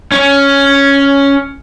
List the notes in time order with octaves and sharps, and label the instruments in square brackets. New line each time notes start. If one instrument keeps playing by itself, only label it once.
[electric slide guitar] C#4